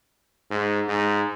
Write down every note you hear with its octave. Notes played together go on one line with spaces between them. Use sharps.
G#2
G#2